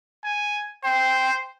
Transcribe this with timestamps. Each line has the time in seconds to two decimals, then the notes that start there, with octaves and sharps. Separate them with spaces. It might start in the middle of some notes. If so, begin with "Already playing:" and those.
0.24 G#5
0.84 C5 G5